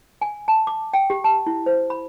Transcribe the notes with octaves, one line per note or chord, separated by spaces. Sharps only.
G#5
A5
D6
G5
G4
A5
E4
C5
B5